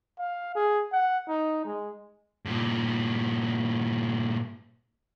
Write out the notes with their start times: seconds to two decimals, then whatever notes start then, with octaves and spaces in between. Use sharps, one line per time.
0.19 F5
0.55 G#4
0.92 F#5
1.28 D#4
1.65 G#3
2.45 G2 A#2